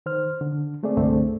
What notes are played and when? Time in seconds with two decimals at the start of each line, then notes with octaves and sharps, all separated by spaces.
0.06 D#3 C5 F6
0.41 D3
0.83 G#3 A3 C4 G#4 D5
0.97 C2 G2 D3 A3 C4